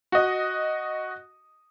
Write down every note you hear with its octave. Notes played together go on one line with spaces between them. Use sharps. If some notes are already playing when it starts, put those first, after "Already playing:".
F#4 D#5